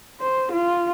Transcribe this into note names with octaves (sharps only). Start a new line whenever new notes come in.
C5
F4